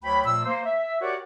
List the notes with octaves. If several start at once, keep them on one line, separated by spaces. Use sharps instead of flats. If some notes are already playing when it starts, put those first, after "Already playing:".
D2 F#3 C#5 G5 B5
A#2 F3 A3 E6
A#3 C5
E5
F#4 G4 A#4 C#5 D5 F#5